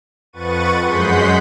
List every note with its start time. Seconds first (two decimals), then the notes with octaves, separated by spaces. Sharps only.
0.33 F2 B4 F#5 C#6 A6 D#7
0.82 F#2 G#3 F#5 C6 G6 B6